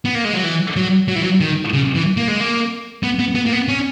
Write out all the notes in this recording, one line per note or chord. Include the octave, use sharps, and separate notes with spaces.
B3
A#3
G#3
F#3
E3
F#3
F#3
E3
F#3
D#3
C#3
E3
A#3
G#3
A#3
B3
B3
B3
A#3
B3
C#4